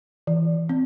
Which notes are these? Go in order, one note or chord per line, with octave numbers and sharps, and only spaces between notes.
E3
C4